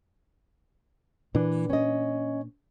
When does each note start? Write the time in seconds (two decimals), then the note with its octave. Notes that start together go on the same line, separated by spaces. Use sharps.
1.35 A#2 E3 D4
1.70 C#4 D#5